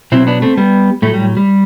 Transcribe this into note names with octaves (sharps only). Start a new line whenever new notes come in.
B2 F#3 C4 E4
B3 D4
A3 C4
G3 B3
A2 F#3 A3
G3
G3